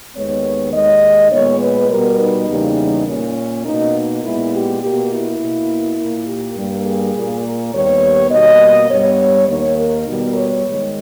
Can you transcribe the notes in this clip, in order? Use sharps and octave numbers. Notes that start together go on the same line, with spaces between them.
D#2 D#3 G#3 B3 C#5
D#2 D#3 G#3 D#5
A#2 G#3 B3 C#5
B4
B2 G3 B3 A#4
D#4
E2 C#3 G3 A#3
A#2 A#3 C#4
B2 A#3 D#4
A#2 G#3 B3 E4
G4
B2 A#3 G4
E4
B2 A#3
A#2 A#3
G4
G2 G3 A#3
G#4
A#2 A#3
A#4
D#2 D#3 G3 B3 C#5
B2 G3 A#3 D#5
G2 G3 B3 C#5
D#2 D#3 A#3 C#5
A#4
B2 G3 B3
C#5
G#2 D#3 G#3